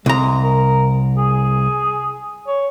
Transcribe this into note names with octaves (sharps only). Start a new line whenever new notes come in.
C2 G#3 A#5
A#4
G#4
C#5